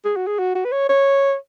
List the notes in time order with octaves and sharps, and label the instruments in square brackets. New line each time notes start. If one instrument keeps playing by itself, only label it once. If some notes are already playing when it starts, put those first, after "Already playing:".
[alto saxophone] G#4
F#4
G#4
F#4
F#4
B4
C#5
C#5